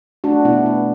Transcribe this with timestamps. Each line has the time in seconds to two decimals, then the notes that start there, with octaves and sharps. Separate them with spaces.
0.24 A3 D4 F#4
0.45 B2 B3 E4
0.66 A3 B3